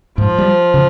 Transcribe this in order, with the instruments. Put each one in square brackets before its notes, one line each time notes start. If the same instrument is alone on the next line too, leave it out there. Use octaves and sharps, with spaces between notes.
[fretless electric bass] G#2 [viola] F3
[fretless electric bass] G3
C#3